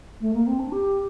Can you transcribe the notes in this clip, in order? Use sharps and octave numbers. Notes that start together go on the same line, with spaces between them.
A3
A#3
C4
D4
G4